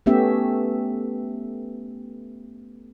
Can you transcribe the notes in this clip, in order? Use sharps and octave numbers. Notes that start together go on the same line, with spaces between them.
A3 B3 C#4 G4 E5